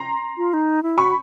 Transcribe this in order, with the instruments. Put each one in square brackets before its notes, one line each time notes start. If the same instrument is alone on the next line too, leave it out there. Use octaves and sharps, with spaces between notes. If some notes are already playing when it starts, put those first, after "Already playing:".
Already playing: [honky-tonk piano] A#5 C6
[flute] F4
D#4
E4
[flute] F#4 [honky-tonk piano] B5 C#6